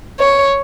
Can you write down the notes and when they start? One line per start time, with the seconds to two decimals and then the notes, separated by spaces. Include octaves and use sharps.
0.19 C#5